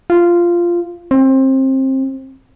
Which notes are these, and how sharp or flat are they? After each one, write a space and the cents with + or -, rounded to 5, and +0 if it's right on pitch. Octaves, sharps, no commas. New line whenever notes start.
F4 -10
C4 +25